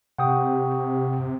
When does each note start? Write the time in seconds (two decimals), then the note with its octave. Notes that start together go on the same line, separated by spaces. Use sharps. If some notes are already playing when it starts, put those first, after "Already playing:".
0.18 C3 G4 F#5 G5 C#6 D#6